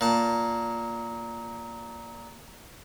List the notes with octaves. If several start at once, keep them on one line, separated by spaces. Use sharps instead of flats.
A#2 A5